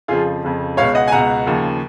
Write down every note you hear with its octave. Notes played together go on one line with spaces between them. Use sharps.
F2 C#3 F3 F4 G#4
F2 C#3 F3
C#2 B2 C#5 F5
D#5 F#5
G#5
C#2 B2 F#5 A#5
D#2 C#3 F3